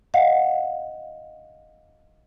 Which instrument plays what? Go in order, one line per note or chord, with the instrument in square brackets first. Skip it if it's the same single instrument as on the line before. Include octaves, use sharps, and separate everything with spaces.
[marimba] D#5 F5 F#5